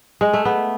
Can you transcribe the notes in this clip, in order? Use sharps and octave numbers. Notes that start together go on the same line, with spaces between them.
G#3
A3
B3